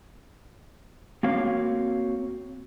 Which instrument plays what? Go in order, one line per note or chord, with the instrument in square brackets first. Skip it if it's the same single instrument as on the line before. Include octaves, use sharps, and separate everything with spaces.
[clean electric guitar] A#3 C4 F#4 C#5 F5